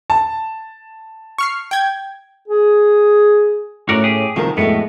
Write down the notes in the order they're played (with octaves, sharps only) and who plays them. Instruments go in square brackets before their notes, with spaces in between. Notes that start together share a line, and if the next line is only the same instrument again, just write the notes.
[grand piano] A5
[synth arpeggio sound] C#6 F6 C7
G5 G#6
[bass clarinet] G#4
[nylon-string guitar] A2 C#4 [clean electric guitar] F#4 A#4 D5
[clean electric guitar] G4 G#4
[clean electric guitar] C2 C3 D#3 [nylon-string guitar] F3 F#4 A#4
[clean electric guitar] F2 A2 B3 [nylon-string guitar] G#3 A3 F#4